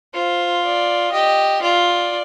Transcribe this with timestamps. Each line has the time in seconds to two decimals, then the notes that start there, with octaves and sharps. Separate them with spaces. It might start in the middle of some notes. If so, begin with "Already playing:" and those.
0.14 F4 C5
0.64 D5
1.12 G4 D#5
1.62 F4 D5